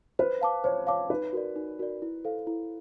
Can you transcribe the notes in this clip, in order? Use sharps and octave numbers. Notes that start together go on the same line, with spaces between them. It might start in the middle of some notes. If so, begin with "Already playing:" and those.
B4 C5
F5 A5 D6
C5 C#5
C#5 F5 A5 D6
D#4 B4
F#4 A#4 D5
D#4
F#4 A#4 D5
E4
A4 C5 F5
E4